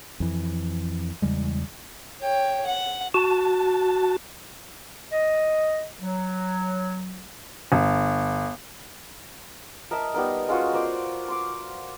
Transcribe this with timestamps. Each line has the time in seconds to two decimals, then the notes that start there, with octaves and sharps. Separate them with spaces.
0.20 F2 E3
1.22 E2 C#3 G3 G#3
2.22 C#5 G5
2.66 F#5
3.14 F#4 A5
5.12 D#5
6.02 F#3
7.72 G1
9.91 A#4 D#5 E5 A5
10.14 G3 B3 D#4 A#4
10.48 G#3 C#4 F4 F#4
10.73 A#4 C5 D5
11.28 C6 D6